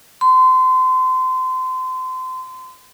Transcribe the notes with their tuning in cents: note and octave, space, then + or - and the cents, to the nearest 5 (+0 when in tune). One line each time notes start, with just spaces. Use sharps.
C6 -30